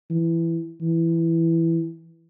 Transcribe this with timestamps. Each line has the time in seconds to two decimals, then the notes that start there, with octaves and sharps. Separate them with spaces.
0.10 E3
0.81 E3